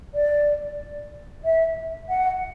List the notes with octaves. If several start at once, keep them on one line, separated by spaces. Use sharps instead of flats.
D5
E5
F#5